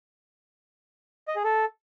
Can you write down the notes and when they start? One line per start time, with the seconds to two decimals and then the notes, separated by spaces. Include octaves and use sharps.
1.28 D#5
1.36 G#4
1.44 A4